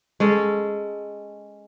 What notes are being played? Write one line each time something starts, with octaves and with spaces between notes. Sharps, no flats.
G#3 C#4 A4